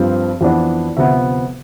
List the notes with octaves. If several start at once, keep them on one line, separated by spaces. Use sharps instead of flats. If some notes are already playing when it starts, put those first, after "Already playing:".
Already playing: G2 F3 C4
F2 E3 B3 D4
D2 C3 F3 B3 E5